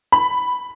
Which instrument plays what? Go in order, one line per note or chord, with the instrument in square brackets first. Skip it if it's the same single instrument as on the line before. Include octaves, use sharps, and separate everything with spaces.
[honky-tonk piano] B5